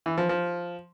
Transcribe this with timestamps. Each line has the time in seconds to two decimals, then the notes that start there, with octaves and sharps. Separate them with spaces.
0.06 E3
0.18 F3
0.29 F3